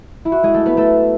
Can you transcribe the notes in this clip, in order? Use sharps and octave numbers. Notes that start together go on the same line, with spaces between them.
E4
F#4
G#3 G#4
A3 A4
B3 B4
A3 A4